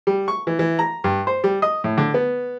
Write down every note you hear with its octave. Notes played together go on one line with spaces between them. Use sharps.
G3
C#6
E3
E3
A#5
G2
C5
G3
D#5
A2
D3
B3